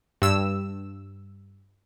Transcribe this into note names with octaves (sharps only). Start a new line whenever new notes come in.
G2 E6